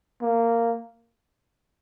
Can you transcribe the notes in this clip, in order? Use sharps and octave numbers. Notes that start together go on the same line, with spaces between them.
A#3